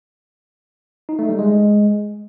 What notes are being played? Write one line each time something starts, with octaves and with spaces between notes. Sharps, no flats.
D#4
A3
G3
G#3